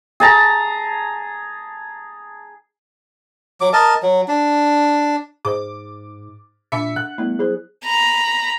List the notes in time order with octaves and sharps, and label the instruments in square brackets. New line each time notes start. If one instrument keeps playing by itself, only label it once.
[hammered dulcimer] G#4 A5 A#5
[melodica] F#3 D6
A#4 D#5 A5
F#3
D4
[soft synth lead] G#2 [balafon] G#4 C5 D#5 [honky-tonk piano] D6
[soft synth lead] A#2 [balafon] D4 B5 D6 [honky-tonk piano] E5 C#7
[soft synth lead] F#5 [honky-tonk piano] F#6
[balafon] G3 B3 E4 [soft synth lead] A3
[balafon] F#3 E4 C5 [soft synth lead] G#4
[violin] A#5 B5